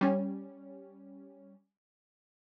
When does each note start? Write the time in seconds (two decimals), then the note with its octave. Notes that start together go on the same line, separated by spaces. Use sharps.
0.01 G3 C#4